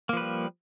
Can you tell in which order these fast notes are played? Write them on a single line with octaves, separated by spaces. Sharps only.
A#3 F3 B4 G3